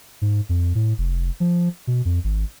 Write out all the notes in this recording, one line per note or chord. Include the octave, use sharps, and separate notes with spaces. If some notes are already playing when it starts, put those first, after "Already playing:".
G#2
F2
A2
F1
F3
B2
F2
G#1